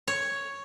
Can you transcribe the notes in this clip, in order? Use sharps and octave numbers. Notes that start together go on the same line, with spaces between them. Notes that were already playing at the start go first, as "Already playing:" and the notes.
C#5